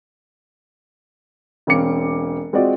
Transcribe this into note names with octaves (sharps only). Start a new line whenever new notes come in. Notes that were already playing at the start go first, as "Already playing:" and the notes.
E1 C4 C#4 F5 D6 C#7
G#3 C4 F4 F#4 D5 D#5